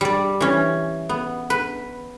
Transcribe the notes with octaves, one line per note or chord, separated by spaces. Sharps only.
G3 D5
E3 C#4
B3
B4